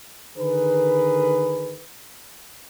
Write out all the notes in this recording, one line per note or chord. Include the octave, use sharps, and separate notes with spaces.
D3 D#3 G#4 A#4 B4